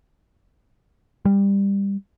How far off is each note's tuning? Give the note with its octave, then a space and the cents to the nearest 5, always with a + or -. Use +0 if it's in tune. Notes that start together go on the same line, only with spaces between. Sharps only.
G3 +20